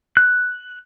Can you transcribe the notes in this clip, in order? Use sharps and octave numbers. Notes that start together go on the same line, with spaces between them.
F#6